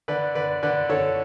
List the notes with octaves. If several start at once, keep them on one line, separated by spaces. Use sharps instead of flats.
D3 B4 D5
D3 B4 D5
D3 B4 D5
D3 A4 C#5